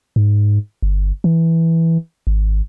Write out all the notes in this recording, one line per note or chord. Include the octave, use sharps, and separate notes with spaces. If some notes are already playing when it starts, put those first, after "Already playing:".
G#2
G1
E3
G#1